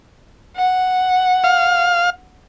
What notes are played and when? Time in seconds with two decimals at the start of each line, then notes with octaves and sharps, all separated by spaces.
0.57 F#5
1.44 F5